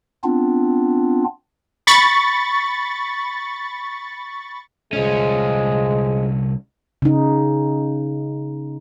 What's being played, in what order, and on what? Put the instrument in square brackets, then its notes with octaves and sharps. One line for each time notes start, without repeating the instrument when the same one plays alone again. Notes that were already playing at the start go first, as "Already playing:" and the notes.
[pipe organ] B3 C4 D4 F4
[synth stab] B5 C#6 A6
[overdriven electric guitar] C2 C#4 [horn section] F3 G#3
[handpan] C#3 D#4